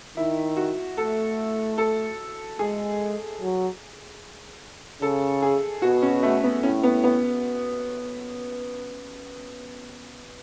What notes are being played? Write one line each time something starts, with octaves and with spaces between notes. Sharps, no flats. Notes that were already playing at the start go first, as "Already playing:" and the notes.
D#3 E4
F#4
A3 A4
A4
G#3 G#4
F#3
C#3 A4
G#4
B2 F#4
C#4
A3
B3
A2 C#4
B3
B3